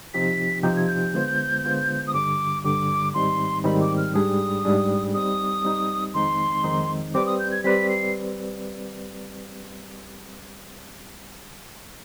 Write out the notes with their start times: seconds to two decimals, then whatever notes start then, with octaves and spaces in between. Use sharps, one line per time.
0.14 C3 F3 C4 D#4 G4 B6
0.63 C3 F3 C4 D#4 G4 G6
0.76 G#6
0.88 G6
1.14 D3 G#3 B3 F4 C5
1.64 D3 G#3 B3 F4 C5
2.07 D#6
2.13 G2 D3 G3 D6
2.64 G2 D3 G3 D6
3.14 G#2 D#3 G3 C4 D#4 C6
3.64 G#2 D#3 G3 C4 D#4 B5
3.81 D6
3.97 F6
4.14 G#2 G3 D4 G#4 D#6
4.65 G#2 G3 D4 G#4
5.14 G3 C4 D#4 D#6
5.65 G3 C4 D#4
6.14 F2 D#3 G#3 C4 D#4 C6
6.64 F2 D#3 G#3 C4 D#4
7.14 G3 C4 G4 B4 D5 D6
7.26 D#6
7.39 G6
7.52 G#6
7.64 G3 C4 G4 B4 D5 B6
7.89 C7